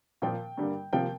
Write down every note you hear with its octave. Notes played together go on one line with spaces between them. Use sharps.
A#2 F3 A#3 G5
G2 D3 G3 A#3
C3 F3 A#3 G5